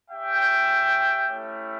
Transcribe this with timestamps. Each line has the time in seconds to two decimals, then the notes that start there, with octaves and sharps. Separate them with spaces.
0.11 C#4 G4 E5 G5
1.30 A3 C#4 E4 G4